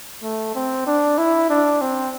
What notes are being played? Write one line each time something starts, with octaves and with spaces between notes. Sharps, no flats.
A3
C4
D4
E4
D4
C4